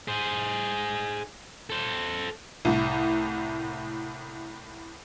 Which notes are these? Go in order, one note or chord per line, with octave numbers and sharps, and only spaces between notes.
G#4 C5
A4 C5
C2 A2